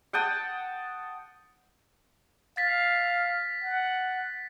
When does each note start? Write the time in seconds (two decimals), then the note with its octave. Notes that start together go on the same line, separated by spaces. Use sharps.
0.13 F#5 G5 A5 D#6
2.57 F5 A6 B6
3.64 F#5